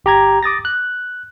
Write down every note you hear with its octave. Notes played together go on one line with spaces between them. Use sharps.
G1 G4 A#5 G#6
D6 D#6 A6 A#6
F#6